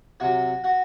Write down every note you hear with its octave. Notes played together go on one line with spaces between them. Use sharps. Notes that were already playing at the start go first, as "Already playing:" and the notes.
C3 F#3 F#4 F#5
F#4 F#5